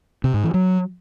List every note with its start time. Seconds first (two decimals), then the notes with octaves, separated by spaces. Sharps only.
0.24 C3
0.34 G#2
0.44 E3
0.54 F#3